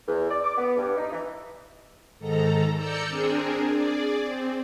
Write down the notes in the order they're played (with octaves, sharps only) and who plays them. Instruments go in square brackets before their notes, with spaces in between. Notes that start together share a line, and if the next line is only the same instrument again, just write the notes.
[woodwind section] E2
D5
D6
B3
G2
D#4
E3
[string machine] G#2 D#3 A4 A#5
D5 A#5 E6 G6 C#7
C4 D4 G#4 A#4
G#4 D5
C4